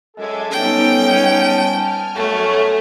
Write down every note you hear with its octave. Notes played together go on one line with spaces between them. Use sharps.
F#2 G#3 A4 E5 D6 G#6
G#2 G3 B3 C#4 D#4 G5
A5
G#5 F6
F#2 A3 B3 C#4 C#5